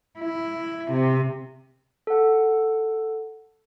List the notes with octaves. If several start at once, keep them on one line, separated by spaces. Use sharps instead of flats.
E4
C3
A4 F#5